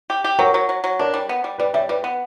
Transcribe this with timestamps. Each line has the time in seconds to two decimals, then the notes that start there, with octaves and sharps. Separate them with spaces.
0.10 G4
0.24 G4
0.39 F#3 F#4 A#4
0.54 F#3
0.69 F#3
0.84 F#3
0.99 D4 A#4 C#5
1.14 G3
1.29 B3
1.44 G3
1.58 G3 B4 D5
1.74 G3 C#5 E5
1.89 G3 B4 D5
2.04 B3